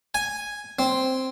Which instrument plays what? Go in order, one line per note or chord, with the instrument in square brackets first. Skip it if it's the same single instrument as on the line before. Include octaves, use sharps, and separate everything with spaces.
[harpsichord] G#5
C4